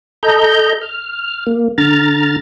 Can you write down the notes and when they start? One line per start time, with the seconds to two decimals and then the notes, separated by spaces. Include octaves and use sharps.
0.23 A4 D#5 A#5 G6
0.81 F6
1.47 A#3
1.78 D3 A#5 F6 A6